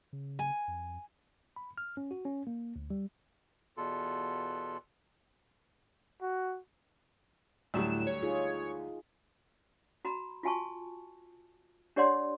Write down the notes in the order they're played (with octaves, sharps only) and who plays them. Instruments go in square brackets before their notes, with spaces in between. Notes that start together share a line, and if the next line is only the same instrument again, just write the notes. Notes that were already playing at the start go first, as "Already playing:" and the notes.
[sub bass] C#3
[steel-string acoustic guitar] G#5
[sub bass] F2
[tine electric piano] B5
F6
C#4
F#4
C#4
A#3
D2
G3
[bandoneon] E2 B2 F4 A4
[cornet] F#4
[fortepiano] D2 F#3 G3 [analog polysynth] A2 E7
[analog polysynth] C#5
[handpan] D#4 F4 G#4
[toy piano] F#4 A#5 B5
F4 F#4 G#5 A5 C#6
D4 G4 C#5 D5 F#5 C6